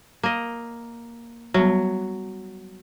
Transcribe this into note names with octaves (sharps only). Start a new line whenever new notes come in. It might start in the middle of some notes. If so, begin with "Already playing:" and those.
A#3 D#5
F#3 G3 B3